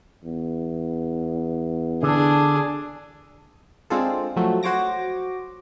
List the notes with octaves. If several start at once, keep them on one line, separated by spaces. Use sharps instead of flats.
E2
D3 D4 G#4
G#3 C4 D4 F4 G#4 A4
F3 F#3 A3
F#4 C5 C#5 D6 A#6